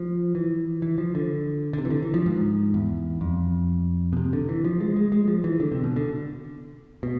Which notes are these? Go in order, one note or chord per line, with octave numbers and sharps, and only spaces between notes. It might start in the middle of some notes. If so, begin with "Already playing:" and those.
Already playing: F3
E3
E3
F3
D3
D3
C3
E3
D3
E3
F3
G#2
E2
F2
B2
C3
D3
E3
F3
G#3
G#3
G#3
F3
E3
D3
C3
B2
D3
B2